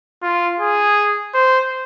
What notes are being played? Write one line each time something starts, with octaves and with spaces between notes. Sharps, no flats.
F4
G#4
C5